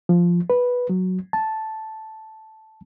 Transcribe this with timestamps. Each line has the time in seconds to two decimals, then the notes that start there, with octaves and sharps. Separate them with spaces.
0.09 F3
0.50 B4
0.89 F#3
1.33 A5